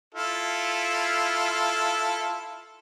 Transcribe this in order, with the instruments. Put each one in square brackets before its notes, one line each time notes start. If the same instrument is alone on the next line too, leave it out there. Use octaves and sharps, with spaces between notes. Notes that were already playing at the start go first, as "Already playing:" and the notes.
[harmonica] E4 F4 A4